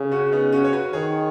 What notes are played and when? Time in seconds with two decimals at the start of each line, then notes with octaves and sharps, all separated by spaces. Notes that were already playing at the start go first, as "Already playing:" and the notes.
Already playing: C#3
0.11 C#4 F#4
0.32 B3 D#4
0.52 C#4 F#4
0.64 C#5
0.73 F#4 B4
0.93 D#3 G#4 C#5